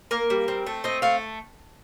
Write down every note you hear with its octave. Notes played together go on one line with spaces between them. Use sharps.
A#3 A#4
G3
C4
A3
C4 D#5
A3 F5